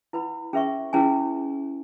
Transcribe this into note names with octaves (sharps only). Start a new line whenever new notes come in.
E4 B4 F#5 B5
C#4 G#4 B4 E5 C#6
C#4 E4 G#4 B4 G#5